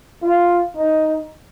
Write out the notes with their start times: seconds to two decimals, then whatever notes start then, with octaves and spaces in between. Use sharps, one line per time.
0.22 F4
0.77 D#4